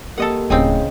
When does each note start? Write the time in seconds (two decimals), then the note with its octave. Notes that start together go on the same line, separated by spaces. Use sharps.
0.18 A#3 G4 A4 A#4 D#5 F#5
0.50 D1 C#3 C4 D#4 D#5 G5 G#5